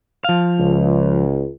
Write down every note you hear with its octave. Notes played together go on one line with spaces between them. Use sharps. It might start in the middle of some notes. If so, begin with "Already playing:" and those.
F3 F5
C#2